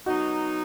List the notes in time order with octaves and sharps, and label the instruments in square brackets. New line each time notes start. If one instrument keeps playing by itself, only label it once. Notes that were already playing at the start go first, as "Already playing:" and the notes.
[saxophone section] F#3 B3 D#4 [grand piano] F#4